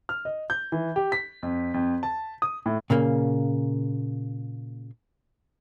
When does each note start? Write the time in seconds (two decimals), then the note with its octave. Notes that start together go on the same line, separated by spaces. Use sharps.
0.09 F6
0.25 D#5
0.50 G6
0.72 E3
0.96 G4
1.12 B6
1.43 F2
1.74 F2
2.03 A5
2.42 D#6
2.66 A2
2.90 A#2 C#3 A#3